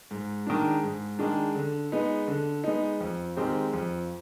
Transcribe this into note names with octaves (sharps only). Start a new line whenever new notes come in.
G#2
D#3 G#3 D4
G#2
D#3 G#3 D4
D3
G#3 B3 D#4
D3
G#3 B3 D#4
F2
D#3 G#3 C4 G4
F2